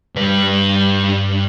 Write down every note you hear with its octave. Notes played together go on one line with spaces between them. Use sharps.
G2 B4